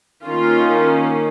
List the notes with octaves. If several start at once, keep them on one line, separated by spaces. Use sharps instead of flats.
D#3 A#3 C#4 F4